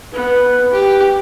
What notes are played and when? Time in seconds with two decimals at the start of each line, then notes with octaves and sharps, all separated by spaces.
0.13 B3 B4
0.72 G4